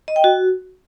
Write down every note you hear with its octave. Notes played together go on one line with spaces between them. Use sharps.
D#5
G5
F#4